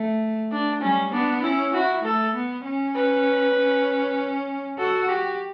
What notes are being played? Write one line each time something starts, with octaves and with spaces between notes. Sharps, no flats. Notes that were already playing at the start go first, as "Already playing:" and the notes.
Already playing: A3
D4
G3 C#4
B3 D4
C#4 E4
E4 F#4
A3 A4
B3
C#4
B4
C#4
F#4 A4
F#4 G4